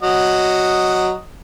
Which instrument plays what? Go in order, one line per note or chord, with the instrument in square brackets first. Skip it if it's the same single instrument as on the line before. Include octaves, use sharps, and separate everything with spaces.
[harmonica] F#3 D#5 F#5